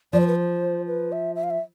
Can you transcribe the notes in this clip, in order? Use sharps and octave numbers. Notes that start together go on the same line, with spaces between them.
F3 D5
C5
B4
C5
B4
E5
E5
F5
E5